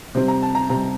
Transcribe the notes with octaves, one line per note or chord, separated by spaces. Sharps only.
C3 G3 C4 C5
A#5
A5
A#5
C3 G3 C4 A#5